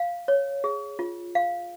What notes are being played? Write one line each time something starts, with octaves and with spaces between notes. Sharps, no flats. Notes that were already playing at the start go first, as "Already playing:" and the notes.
Already playing: F5
C#5
G#4
F4
F5